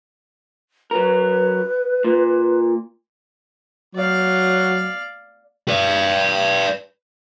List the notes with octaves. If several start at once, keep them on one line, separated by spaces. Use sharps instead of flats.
F#3 A#4 B4
A#2
F#3 D5 F5
B4 D5